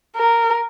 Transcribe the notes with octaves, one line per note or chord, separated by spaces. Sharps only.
A#4